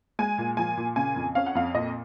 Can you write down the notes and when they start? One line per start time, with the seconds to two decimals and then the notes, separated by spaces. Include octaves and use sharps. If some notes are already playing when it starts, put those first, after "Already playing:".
0.19 G#3 G#5
0.38 A#2
0.57 F3 G#5
0.77 A#2
0.96 C#3 G#5
1.16 F2
1.35 C#4 F5
1.46 F#5
1.55 F2 F5
1.75 A#2 D#5